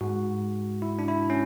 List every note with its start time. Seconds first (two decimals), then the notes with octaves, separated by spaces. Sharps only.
0.01 G#2 G#3 F#4
0.82 E4
0.99 D4
1.08 E4
1.30 C#4